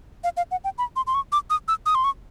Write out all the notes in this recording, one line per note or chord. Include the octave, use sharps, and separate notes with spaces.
F5
F5
F#5
G5
B5
C6
C6
C#6
D6
D#6
E6
D#6
C6
C#6